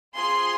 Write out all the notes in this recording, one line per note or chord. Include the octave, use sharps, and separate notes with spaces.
C4 F4 G#4 C6